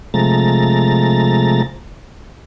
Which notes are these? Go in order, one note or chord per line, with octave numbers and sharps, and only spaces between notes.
C3 F3 G#3 A3 A#5 A6